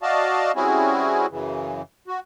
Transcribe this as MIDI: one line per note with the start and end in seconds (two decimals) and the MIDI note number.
0.02 0.52 66
0.02 0.52 74
0.02 0.52 75
0.02 0.52 77
0.02 0.52 81
0.56 1.26 55
0.56 1.26 60
0.56 1.26 61
0.56 1.26 64
0.56 1.26 66
0.56 1.26 68
1.30 1.82 42
1.30 1.82 49
1.30 1.82 52
2.07 2.20 66